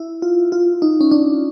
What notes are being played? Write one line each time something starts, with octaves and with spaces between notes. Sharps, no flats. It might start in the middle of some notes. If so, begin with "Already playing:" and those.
Already playing: E4
F4
F4
D#4
C#4
D4